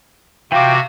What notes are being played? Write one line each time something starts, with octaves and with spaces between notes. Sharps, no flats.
C3 E3 F4 F#4 F5 G5 D6